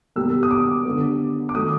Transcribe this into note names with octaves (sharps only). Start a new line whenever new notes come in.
B2 G3 A#3 E6
D#6
D6
D3 G3 B3
D6
D#3 F#3 A3 D#6